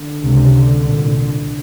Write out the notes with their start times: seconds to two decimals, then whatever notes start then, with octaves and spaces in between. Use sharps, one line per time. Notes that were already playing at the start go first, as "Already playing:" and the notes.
Already playing: D3
0.22 C#2 C3
0.82 C2 A#2